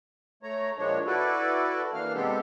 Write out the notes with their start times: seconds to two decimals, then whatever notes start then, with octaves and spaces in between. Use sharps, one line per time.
0.43 A3 C#5 A#5
0.78 A#2 F3 G#3 D4 C#5
1.06 E4 F#4 A4 B4 D5
1.93 E3 A#3 D4 F5 F6
2.14 C3 G#3 B3 C4 G4 A4